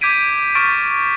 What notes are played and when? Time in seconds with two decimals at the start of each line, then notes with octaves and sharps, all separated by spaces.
0.01 D6 G6 G#6 B6 D7 D#7
0.55 C#6 F6 A6 B6 D7